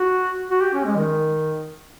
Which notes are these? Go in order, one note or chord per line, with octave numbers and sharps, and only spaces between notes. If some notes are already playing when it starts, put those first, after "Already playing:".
Already playing: F#4
F#4
G4
C#4
G#3
D#3